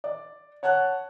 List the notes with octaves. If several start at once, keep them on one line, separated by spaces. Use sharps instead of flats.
D5
C#5 F#5 A5 F#6